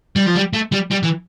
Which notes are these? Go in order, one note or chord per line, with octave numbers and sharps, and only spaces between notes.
G3
F3
G3
A3
G3
G3
E3